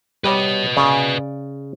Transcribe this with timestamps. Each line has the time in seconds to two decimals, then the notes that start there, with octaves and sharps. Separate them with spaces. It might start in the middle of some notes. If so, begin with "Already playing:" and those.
0.24 G3 B4 C#5 D#5
0.77 C#3 D5